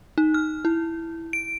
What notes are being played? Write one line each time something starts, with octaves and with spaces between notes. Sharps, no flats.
D#4
F6
E4
D7